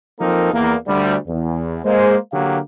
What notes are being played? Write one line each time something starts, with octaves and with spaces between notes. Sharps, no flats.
F3 A#3 C4 D#4 A4 A#4
E2 A#3
D2 G3
E2
G#3 A#3 C5
D3 F#3 A#3 G4 F5